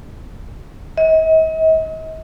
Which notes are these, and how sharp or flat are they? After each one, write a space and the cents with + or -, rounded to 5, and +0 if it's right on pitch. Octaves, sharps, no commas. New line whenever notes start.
D#5 +45